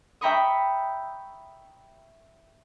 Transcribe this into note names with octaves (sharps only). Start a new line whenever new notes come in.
E5 G5 A#5 B5 C#6 D#6